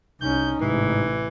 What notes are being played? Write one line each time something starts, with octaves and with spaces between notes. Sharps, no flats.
C2 C#4 D#4 G6
A1 G#2 C3 E3